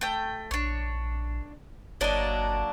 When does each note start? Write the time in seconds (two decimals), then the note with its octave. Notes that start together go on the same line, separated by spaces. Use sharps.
0.01 A3 G5
0.51 A#1 D4 C#5
2.01 G1 F#3 A#3 D4 D5 D#5